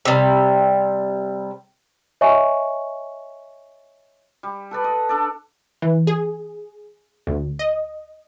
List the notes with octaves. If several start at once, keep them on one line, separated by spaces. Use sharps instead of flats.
C3 G3
C#5 D#5 E5 G#5 C#6
G3
A4 B4 D5
D#5
D4 A4 D5
E3
G#4
D2
D#5